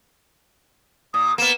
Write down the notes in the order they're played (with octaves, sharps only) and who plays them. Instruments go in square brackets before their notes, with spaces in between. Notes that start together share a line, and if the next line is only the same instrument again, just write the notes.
[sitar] A#2 [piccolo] D#6
[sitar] A#3 B3 [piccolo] E7